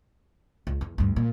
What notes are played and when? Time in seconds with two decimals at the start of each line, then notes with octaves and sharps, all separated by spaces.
0.67 C#2
0.81 E2
0.98 D2 G2
1.16 A#2